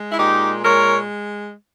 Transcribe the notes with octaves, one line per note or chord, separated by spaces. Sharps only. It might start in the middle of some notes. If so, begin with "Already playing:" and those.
Already playing: G#3
E4
A#2 D#4 G4
G#3 A#4 C#5